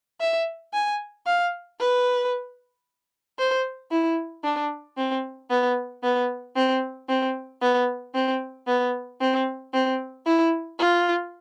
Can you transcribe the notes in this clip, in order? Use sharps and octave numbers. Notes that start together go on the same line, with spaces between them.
E5
G#5
F5
B4
C5
E4
D4
C4
B3
B3
C4
C4
B3
C4
B3
C4
C4
E4
F4